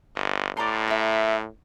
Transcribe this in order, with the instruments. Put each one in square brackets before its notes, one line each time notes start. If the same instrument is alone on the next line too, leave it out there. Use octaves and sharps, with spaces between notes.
[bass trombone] G1
[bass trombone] A2 [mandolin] D5 A#5 C6
[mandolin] A#4 E5